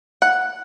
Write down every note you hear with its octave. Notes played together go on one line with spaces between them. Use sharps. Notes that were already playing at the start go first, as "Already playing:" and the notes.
F#5